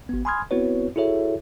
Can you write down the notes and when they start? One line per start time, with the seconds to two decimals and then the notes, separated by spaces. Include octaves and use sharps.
0.09 G#1 B3
0.25 G#5 B5 C6 D#6 F6 G#6
0.51 B3 C4 E4 F#4 B4 C#5
0.96 E4 F#4 G#4 A4 C#5 E5